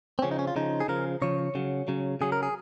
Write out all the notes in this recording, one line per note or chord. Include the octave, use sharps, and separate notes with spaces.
C4
C#3 F3 C#4
D#4
C#4
F4
C#3 F3 D#4
G#4
C#3 F3 A#4
C#3 F3 C#5
C#3 F#3
C#3 F#3
C#3 F#3 G#4
A#4
G#4